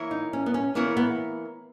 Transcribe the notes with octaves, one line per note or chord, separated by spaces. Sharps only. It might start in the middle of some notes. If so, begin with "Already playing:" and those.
Already playing: E3 A#3 E4 A#4 C#5
D#4
C#4
B3
C#4
E3 A#3 B3 E4 A#4 C#5
B3